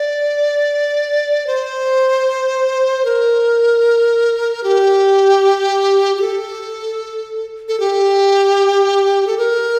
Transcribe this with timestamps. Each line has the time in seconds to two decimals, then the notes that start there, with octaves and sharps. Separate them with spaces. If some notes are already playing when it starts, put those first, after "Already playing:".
Already playing: D5
1.47 C5
3.05 A#4
4.64 G4
6.17 G4
6.21 A4
7.68 A4
7.80 G4
9.27 A4
9.38 A#4